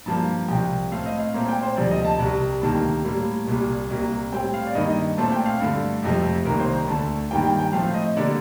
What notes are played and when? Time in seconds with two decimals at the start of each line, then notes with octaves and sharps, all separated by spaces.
0.06 G2 F3 A#3 A5
0.48 C2 C3 F3 G5
0.92 A2 A3 C4 F5
1.06 D#5
1.20 F5
1.34 A#2 A3 C4 A#5
1.49 G5
1.63 C5
1.77 D2 C3 F3 D5
1.91 D#5
2.05 A5
2.19 C2 C3 G3
2.61 D2 C3 D#3 A#3 A5
3.04 A2 G3 A#3
3.48 C2 A#2 G3
3.90 C2 C3 G3 A#3
4.32 A2 G3 C4 G5
4.54 F5
4.66 D5
4.75 G2 D#3 A#3 D#5
4.90 D#5
5.17 A#2 A3 C4 A5
5.32 G5
5.46 F5
5.60 G2 D3 A3
6.03 F2 C3 F3 A3
6.45 C2 C3 D#3 A#3 A#4
6.60 C5
6.73 A#5
6.87 D2 D3 A3 A5
7.31 G2 D#3 G3 A#3 G5
7.45 G5
7.59 G5
7.73 A2 F3 A3 C4 F5
7.94 D#5
8.16 D3 G3 A#3 D5